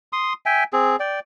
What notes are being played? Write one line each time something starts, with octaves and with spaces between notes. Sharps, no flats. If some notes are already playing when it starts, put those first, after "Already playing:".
C6 D#6
E5 G5 G#5
C4 G#4
D5 G5